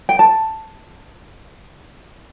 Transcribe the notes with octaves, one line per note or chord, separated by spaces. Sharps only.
G5
A5